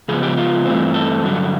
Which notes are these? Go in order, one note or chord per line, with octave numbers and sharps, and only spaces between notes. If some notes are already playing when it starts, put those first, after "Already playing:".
C#3 F3 G#3 B3 G#4
G4
F4
G2 E3 A3 C4
A4
G2 D3 F#3